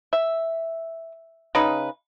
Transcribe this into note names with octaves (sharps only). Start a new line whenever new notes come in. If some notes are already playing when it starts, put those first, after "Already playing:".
E5
C#3 D#4 B4